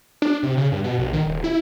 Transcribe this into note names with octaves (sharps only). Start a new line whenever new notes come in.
D4
C3
C#3
G2
B2
A#1
D#3
D#1
E4